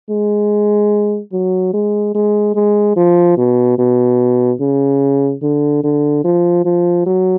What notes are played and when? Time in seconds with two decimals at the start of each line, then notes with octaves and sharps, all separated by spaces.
0.10 G#3
1.32 F#3
1.74 G#3
2.15 G#3
2.55 G#3
2.96 F3
3.37 B2
3.79 B2
4.60 C#3
5.42 D3
5.84 D3
6.24 F3
6.65 F3
7.06 F#3